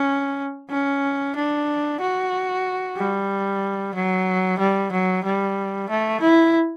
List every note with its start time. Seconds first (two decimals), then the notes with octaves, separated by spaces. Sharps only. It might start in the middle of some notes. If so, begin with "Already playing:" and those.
Already playing: C#4
0.70 C#4
1.36 D4
2.01 F#4
2.97 G3
3.95 F#3
4.59 G3
4.93 F#3
5.25 G3
5.90 A3
6.21 E4